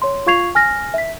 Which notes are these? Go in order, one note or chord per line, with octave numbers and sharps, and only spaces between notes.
C#5 C6
F4 F5 C#6 G#6 C7 F7
G#5 F6 A#6
E5 B6